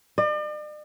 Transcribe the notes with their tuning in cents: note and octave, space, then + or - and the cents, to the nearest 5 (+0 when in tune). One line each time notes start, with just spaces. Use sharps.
D5 +45